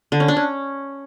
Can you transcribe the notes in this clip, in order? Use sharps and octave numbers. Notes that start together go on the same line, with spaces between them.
D3
C#4
D4
C#4